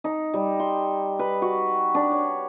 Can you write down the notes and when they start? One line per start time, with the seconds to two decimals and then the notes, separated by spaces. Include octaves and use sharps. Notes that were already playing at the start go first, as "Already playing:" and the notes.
0.04 D#4
0.34 G3
0.60 C6
1.19 B4
1.42 F#4
1.95 D4
2.12 C#5